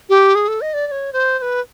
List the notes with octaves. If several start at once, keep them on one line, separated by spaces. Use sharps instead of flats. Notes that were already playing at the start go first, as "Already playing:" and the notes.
G4
G#4
A4
D#5
D5
D5
C#5
C5
C5
B4